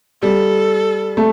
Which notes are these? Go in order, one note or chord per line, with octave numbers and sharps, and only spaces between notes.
G3 A4
A3